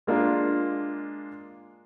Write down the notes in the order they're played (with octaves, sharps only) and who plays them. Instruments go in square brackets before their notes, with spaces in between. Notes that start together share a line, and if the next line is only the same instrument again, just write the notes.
[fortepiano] G#3 A#3 D4 F4